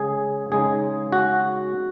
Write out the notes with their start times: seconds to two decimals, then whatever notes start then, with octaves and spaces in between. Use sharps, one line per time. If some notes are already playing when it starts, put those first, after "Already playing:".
Already playing: C#3 G#3 C#4 G#4
0.52 C#3 G#3 D#4 G#4
1.12 F#4